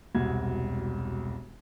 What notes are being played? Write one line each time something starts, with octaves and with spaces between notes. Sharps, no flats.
E1 C2 F#4 G#6